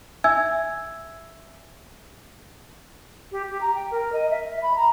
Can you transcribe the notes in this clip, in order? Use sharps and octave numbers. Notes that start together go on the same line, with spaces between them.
E5 G#5 E6 G#6
G4
G4
A#5
G5
A#4
D#5
E5
B5
A#5